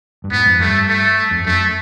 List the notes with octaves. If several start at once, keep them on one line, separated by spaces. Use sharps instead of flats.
G2
G#2 B3
F2
G2 A3
A3
F2
F#2 A3